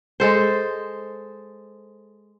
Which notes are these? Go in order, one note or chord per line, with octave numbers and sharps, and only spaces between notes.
G#3 A4 C5